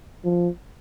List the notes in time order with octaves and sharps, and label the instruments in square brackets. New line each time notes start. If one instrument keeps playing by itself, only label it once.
[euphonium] F3